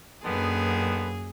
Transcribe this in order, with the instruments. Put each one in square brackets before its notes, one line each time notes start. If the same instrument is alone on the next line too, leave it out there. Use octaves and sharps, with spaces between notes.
[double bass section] F#2 [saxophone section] D3 D#3 B3 [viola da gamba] F#3 A#3 G#4